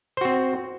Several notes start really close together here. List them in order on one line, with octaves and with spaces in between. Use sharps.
C5 F#4 C4